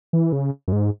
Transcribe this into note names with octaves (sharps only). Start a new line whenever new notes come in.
E3
C#3
F#2
G#2